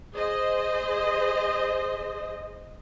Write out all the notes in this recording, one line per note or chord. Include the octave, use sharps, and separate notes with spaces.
G#4 C5 D#5